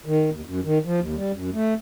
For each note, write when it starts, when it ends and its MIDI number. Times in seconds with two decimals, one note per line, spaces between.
0.06 0.30 51
0.31 0.41 39
0.45 0.60 42
0.64 0.78 51
0.85 1.00 53
1.00 1.15 39
1.15 1.32 55
1.32 1.50 42
1.53 1.74 57